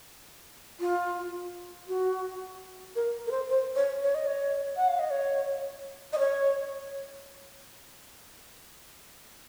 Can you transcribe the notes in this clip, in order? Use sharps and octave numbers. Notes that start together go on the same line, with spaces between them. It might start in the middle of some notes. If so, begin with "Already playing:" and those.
F4
F#4
A#4
A#4
C5
C5
C#5
C#5
D#5
C#5
F#5
F5
D#5
C#5
D#5
C#5